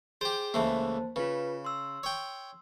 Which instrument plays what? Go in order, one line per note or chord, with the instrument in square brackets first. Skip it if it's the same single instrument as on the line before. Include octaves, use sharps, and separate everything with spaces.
[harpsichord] G4 C5 [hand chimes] G#4
[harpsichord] C#2 E3 A3 [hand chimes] A#3 C5 A5
[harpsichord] C#3 [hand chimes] F4 B4
[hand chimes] C6 E6
[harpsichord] C#5 G5